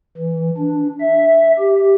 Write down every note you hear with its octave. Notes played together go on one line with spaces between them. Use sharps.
E3
D4
E5
G4